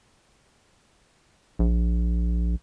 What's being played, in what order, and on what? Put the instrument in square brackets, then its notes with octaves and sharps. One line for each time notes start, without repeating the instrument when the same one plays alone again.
[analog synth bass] A#1